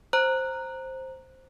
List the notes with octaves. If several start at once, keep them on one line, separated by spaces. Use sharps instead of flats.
C5 A#5 F#6